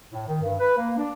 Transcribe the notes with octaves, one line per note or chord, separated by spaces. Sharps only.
A2
D#3
G2
B4
A#3
D4